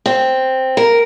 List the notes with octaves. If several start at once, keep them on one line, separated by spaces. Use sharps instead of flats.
C4
A#4